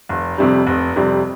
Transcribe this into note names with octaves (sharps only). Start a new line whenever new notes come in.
F1
F2 C3 G3
F1
F2 C3 G3